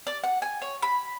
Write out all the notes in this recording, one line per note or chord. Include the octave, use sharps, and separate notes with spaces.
D5
F#5
G#5
C#5
B5